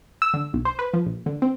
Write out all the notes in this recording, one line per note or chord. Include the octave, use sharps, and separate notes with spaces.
E6
D3
B1
C5
B4
F3
A#1
D3
C4